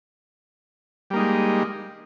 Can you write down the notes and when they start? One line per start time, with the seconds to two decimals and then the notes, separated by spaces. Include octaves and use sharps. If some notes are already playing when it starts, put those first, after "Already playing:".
1.10 G3
1.13 A#3
1.16 D#4
1.19 G#3